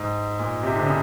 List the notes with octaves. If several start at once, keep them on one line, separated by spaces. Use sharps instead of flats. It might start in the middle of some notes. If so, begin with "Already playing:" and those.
Already playing: G#2
A#2
C3
D3
C#3